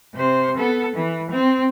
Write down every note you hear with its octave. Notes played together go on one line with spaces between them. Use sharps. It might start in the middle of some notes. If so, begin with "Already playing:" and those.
C3 C5
B3 A4
E3
C4